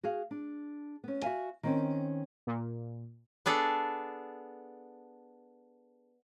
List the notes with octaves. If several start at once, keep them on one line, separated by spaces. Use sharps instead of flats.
F#4 G#4 F5
D4
B3 C#4
F#4 E5 F5 G#5
D#3 C4 C#4
A#2
B3 D4 G#4 A4